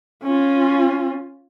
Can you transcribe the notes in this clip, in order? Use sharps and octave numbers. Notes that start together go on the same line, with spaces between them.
C#4 F4